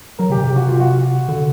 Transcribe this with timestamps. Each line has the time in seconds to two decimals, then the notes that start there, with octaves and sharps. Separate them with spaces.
0.19 F#3 A#4
0.30 C#3 G4
0.37 C3
0.44 G4
0.56 F#4
0.68 F4
0.80 F#4
1.28 D3